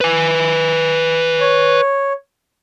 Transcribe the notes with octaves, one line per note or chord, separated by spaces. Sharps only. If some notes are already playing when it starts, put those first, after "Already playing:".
B4 G#5
C#5